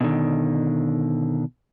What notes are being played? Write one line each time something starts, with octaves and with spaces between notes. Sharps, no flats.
B2 D3 D#3